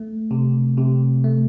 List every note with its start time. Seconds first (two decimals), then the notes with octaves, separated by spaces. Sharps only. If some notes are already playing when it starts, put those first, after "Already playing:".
Already playing: A3
0.31 C3
0.77 C3
1.24 A3